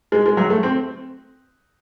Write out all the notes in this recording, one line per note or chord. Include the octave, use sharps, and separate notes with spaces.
G#3
G#3
F#3
A3
C4